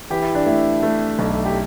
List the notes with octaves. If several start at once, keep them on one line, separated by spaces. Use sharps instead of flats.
E3 G4
E4
D4
A3 E4
A3
B1
G4